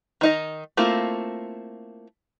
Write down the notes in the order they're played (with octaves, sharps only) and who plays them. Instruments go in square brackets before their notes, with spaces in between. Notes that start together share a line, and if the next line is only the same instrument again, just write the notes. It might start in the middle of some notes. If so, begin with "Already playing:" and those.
[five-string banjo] D#3 D#4 D#5
A3 A#3 C4 E4 F4